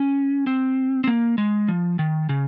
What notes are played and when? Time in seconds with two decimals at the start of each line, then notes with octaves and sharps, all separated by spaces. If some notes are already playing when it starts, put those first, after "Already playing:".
Already playing: C#4
0.47 C4
1.04 C4
1.07 A#3
1.38 G#3
1.68 F3
1.99 D#3
2.29 C#3